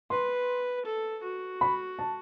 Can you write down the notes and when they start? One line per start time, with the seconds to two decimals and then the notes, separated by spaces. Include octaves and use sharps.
0.10 B4 C6
0.85 A4
1.23 F#4
1.61 B5
1.99 A5